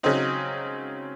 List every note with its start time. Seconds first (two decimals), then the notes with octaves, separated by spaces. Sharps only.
0.03 C#3 F#3 C4 D#4